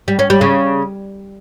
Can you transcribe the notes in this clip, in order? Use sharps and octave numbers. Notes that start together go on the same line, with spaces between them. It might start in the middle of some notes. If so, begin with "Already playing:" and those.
G3
C#4
G3
C#3